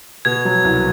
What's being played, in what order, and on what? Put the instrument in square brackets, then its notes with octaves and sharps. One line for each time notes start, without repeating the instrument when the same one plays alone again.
[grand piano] B2 [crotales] G#6
[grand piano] F#3
C2